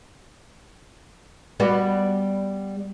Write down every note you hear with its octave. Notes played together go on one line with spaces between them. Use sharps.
G3 B3 F#4